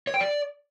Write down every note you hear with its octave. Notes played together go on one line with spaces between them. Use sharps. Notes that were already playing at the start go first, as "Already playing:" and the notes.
C#5
G5
D5